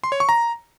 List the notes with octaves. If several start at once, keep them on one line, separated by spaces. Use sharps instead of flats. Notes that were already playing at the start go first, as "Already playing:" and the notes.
C6
C#5
C#6
A#5